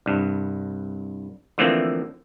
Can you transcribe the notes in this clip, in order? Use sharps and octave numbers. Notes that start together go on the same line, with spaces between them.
C2 G2
D3 E3 F3 A3 A#3 C4